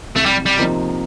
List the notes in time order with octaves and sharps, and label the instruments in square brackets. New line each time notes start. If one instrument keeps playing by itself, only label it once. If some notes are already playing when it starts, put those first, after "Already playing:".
[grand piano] C2 [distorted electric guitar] A3
[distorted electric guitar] G3
G3
[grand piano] C3 F3 A#3 D#4